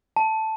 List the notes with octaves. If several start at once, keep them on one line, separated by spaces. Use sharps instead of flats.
A5